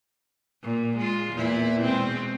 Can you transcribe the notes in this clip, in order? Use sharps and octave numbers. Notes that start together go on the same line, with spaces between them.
A#2
G#3 F4
E2 A#2 E4
B2 G#3 C4